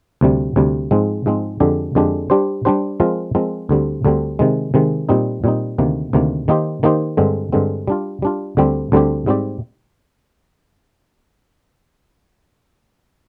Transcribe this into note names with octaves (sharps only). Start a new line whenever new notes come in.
D2 C3 G3
D2 C3 G3
G#2 F3 G#3 C4
G#2 F3 G#3 C4
F2 D3 G#3 D4 G4
F2 D3 G#3 D4 G4
G3 D4 G4 C5
G3 D4 G4 C5
F3 G#3 C4 F4 A#4
F3 G#3 C4 F4 A#4
D2 D3 G3 C4
D2 D3 G3 C4
C3 D#3 G#3
C3 D#3 G#3
A#2 G3 C4 D#4
A#2 G3 C4 D#4
D2 C3 D#3 A#3
D2 C3 D#3 A#3
D#3 A#3 D#4 G4 C5
D#3 A#3 D#4 G4 C5
G2 D3 G#3 C4
G2 D3 G#3 C4
G3 D4 F4
G3 D4 F4
D2 D3 G3 C4 G4
D2 D3 G3 C4 G4
G#2 G3 C4 G4 D5